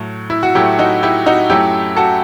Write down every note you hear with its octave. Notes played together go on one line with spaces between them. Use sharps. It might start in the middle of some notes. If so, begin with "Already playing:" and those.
Already playing: A2 F#3 A3
E4
F#4
A2 F#3 A3 E4 G4
D#4 F#4
E4 G4
D#4 F#4
F#2 F#3 A3 E4 G4
F#4 A4